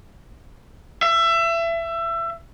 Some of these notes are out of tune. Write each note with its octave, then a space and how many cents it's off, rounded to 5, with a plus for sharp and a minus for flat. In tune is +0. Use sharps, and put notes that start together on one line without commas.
E5 +25